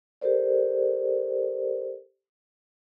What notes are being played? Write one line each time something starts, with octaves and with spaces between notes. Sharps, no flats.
G4 A4 A#4 C5 D5